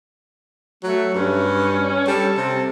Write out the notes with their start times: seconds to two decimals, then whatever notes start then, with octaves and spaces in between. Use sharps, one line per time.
0.83 F#3 A3
1.15 G2 C#4
2.07 G3 A4
2.37 C3